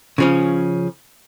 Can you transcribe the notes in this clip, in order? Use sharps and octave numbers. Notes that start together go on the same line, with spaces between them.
C#3 F3 C#4